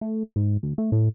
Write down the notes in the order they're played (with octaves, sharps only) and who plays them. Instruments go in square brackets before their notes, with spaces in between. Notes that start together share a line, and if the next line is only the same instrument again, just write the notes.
[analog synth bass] A3
G#2
D2
A3
A2